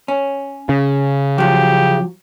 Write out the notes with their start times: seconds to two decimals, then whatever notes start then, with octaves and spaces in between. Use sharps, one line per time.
0.08 C#4
0.69 C#3
1.38 F3 F#3 G4